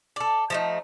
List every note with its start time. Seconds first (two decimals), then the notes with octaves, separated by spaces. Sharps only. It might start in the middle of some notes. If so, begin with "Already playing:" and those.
0.16 A4 D5
0.50 F3 A3 D#4